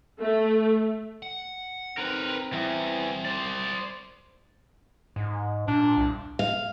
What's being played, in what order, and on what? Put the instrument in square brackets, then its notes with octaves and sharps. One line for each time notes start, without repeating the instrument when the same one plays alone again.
[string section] A3
[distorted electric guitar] F#5
[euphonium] C4 [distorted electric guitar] D#4 [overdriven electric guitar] A#4 B4
[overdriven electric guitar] E2 [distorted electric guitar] G3 E5
[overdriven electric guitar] C5 D5
[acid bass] G#2
[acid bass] A#2 [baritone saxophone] D4
[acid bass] C2
[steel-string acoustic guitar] F5